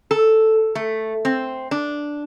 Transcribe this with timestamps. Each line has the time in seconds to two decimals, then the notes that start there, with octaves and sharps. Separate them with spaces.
0.11 A4
0.75 A3
1.25 C4
1.71 D4